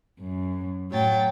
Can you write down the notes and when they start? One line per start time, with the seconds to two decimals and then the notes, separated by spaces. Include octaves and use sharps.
0.21 F#2
0.91 A2 F#3 G5 A6